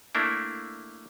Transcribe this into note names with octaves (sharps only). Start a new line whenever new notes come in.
A3 A#3 D4 E4